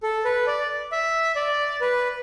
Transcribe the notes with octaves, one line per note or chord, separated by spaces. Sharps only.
A4
B4
D5
E5
D5
B4